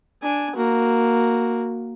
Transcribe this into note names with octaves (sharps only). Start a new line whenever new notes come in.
D4 G#5
A#3 F#4